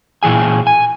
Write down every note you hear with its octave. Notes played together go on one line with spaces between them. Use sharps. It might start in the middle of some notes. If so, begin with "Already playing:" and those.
A#2 E3 G#4 G#5
G#5